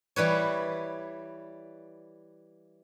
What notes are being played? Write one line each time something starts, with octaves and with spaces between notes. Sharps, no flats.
E3 G3 B4 C#5